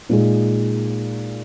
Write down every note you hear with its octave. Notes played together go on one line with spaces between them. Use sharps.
A#2 G#3 D#4 G#4